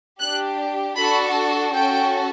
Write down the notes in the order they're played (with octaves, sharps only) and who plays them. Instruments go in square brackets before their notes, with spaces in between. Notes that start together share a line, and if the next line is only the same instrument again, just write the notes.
[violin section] D4 G4 F#6
D4 F#4 A4 B5
C#4 F#4 A4 G5